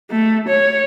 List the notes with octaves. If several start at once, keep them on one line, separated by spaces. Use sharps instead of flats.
A3
C#5